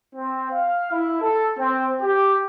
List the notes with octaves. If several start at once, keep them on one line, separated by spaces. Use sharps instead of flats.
C4
F5
E4
A4
C4
G4